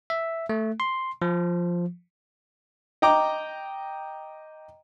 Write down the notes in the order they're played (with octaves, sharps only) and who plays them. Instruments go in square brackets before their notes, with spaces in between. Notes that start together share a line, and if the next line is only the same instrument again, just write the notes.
[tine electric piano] E5
A3
C6
F3
[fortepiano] D#5 G5 A#5 D6